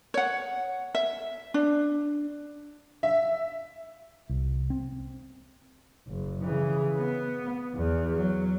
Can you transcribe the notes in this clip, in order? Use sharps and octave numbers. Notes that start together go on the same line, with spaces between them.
C#5 F#5
E5
D4
E5
C2
C4
F#1
C#3 E3
B3
E2
F#3